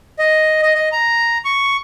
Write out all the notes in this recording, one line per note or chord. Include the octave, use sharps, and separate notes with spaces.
D#5
D#5
D#5
A#5
C#6